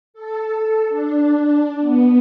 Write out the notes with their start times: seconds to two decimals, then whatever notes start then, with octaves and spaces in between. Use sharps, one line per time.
0.14 A4
0.89 D4
1.80 B3